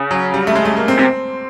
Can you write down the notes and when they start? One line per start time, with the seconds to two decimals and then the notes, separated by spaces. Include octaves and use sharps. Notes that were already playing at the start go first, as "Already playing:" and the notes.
Already playing: C#3
0.11 F#3
0.34 G3
0.47 A3
0.55 G#3
0.65 A3
0.77 A#3
0.88 C4
0.99 C3 C4